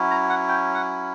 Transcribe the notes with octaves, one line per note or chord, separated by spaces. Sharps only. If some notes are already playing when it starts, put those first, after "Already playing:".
Already playing: F#3 C#4 E4
A#5
F#5
G5
F#5